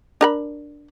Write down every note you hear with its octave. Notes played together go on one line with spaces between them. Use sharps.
D4 A#4 B5